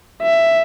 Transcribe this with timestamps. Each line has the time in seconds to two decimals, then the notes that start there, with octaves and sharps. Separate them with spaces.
0.22 E5